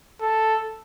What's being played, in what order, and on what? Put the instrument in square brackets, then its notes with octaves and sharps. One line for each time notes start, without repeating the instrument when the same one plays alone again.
[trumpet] A4